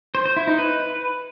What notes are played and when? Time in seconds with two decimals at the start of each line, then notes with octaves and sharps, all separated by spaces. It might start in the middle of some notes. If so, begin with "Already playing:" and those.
0.15 C5
0.26 C5
0.37 E4
0.47 D#4
0.58 B4